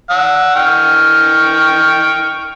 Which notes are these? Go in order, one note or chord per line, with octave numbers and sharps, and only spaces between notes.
F#5 E6
G5 C#6 F6